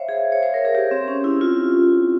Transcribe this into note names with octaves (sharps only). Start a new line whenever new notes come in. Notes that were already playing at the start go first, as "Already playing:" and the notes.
Already playing: C5 C#5 E5 F5
G#4
C#5
C5
A#4
G#4
G4
C4
C#4
E4
F4